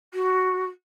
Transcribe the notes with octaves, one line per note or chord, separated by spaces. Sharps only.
F#4